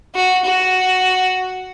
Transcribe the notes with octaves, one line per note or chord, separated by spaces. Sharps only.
F#4
F#4